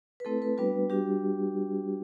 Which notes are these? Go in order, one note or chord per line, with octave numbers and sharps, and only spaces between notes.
B4
A3 C4 E4 A4
B4
G3 B3 D4 F#4 B4
G3 D4 F#4 G4